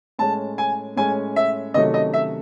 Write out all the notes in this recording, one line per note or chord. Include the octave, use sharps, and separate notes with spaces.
A2 G#3 C#4 A5
G#5
A2 G#3 C#4 G#5
E5
C3 D#3 F#3 A3 C#4 D#5
D#5
E5